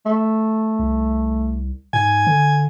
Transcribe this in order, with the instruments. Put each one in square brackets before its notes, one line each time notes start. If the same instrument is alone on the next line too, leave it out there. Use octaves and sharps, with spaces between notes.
[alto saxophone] A3
[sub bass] C2
[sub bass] G#2 [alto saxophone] G#5
[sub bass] D3